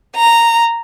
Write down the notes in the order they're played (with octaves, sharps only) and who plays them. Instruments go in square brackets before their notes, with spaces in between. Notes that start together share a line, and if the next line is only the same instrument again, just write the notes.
[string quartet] A#5